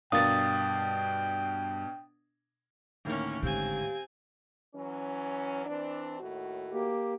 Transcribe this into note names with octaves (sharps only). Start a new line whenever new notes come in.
G2 B2 D4 A#4 F5 G5 D#6 A6
D2 A2 D#3 A#3 C#4
G#1 D3 C4 G4 F5 G#5
E3 F#3 C#4
E3 C4 D4
D#2 A2 F#4
A#3 G4